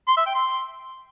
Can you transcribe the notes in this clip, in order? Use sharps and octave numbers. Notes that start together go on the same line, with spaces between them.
C6
E5
G5
C6